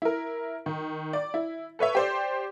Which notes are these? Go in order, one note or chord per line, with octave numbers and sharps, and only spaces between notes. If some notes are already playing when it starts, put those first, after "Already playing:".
E4 A#4
D#3
D5
E4
A4 B4 C#5 E5
G4 C5 D5